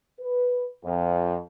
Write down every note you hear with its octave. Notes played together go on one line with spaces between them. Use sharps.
B4
F2